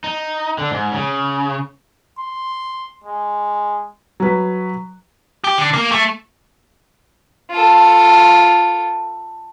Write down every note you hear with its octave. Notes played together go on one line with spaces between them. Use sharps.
D#4
D3
G#2
C#3
C6
G#3
F#3 B4
G4
D3
A#3
A3
F4 A4